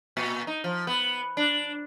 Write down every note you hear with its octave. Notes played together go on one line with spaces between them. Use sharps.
A#2
D#4
F3
B3
D4